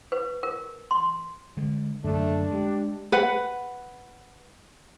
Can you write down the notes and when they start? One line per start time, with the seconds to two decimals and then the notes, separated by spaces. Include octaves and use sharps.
0.12 B4
0.43 A#4
0.91 C6
1.57 D3 G#3
2.04 F#2 D3 D#3 A3 D4
2.51 G#3 G4
3.12 B4 F#5